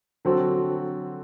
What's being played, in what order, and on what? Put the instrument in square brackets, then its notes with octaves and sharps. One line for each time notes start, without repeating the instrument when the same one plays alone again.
[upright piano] D3 F#3 C4 F#4 A4